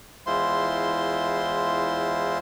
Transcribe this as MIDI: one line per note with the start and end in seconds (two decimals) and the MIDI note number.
0.27 2.38 40
0.27 2.38 56
0.27 2.38 64
0.27 2.38 65
0.27 2.38 72
0.27 2.38 84